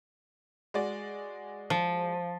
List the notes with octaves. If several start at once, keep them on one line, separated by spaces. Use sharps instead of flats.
G#3 F#4 D5
F3